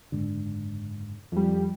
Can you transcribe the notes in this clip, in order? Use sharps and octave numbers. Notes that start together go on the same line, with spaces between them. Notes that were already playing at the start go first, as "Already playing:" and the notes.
F#1 G#2 D3
F2 G3